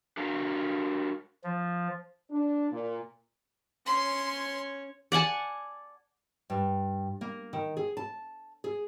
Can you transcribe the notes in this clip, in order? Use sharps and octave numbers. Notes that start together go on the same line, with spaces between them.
D4 F#4 A#4 F5 A#5
F3
D4
A#2
C#4 C#5 C6
D5 F#5 G#5 A5
G2
A#3
D#3
G#4
A5
G#4